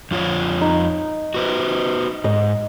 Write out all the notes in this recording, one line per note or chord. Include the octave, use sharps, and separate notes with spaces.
F2 F4 C#5
D#4
F#4 B4 C5
G#2 D#5